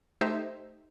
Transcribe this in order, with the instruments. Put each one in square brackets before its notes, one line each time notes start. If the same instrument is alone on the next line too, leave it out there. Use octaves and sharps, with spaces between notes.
[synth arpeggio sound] A3 D#4 G4 C5 E5